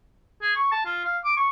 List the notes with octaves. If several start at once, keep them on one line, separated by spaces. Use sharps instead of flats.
G#4
C#6
A5
F4
F5
D6
C#6